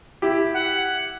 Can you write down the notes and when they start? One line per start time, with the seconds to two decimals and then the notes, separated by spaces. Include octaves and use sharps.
0.22 E4 G4
0.53 F#5